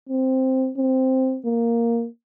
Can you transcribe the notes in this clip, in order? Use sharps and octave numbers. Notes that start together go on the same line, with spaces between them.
C4
C4
A#3